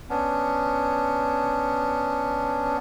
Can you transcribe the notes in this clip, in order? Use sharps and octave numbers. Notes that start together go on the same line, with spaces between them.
B3 C#4 D4